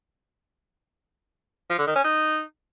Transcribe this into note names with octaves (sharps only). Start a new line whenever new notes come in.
F3
D3
D#3
C#4
D#4